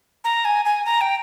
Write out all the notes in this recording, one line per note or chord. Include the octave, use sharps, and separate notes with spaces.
A#5
G#5
G#5
A#5
G5